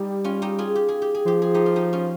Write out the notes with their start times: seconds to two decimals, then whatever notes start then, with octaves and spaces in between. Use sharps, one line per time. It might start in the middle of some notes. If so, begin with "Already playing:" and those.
Already playing: G3 D#4 G4
0.24 C#4 F4
0.42 D#4 G4
0.58 F4 G#4
0.75 G4
0.89 G#4
1.02 G4
1.15 G#4
1.26 F3 G4
1.42 G#4
1.54 D#4 G4
1.66 F4
1.76 D#4 G4
1.93 C#4 F4